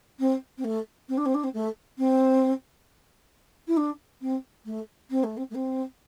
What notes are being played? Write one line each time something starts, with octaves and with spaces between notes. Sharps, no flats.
C4
C4
A3
C4
D4
C4
D4
C4
A3
C4
E4
D4
C4
A3
C4
A3
C4
A3
C4